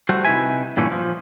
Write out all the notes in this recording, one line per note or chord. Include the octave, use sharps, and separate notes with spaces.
G3 A3 F#4 C5
C3 D#4 E4 B4 E5 G#5
G2 A#2 D3 E3 A3 C#4
F3